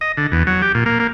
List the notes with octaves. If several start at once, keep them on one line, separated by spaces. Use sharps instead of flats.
D#5
D3
E2
F#3
G4
A#2
A#3
A#3